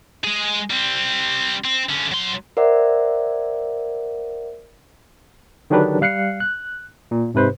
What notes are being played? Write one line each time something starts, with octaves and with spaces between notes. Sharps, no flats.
G#3 G#4
G3 C4
C4
D3 C#4
F#3 C6
A#4 C5 D5 E5 F#5
D3 D#3 F#3 D4 G4 B4
G3 F5 F#6 C7 C#7
F#6
A#2
G#2 C3 B4 C5